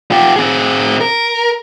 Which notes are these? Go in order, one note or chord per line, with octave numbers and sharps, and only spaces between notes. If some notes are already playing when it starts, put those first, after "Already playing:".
F4 G4
C4 G#4
A#4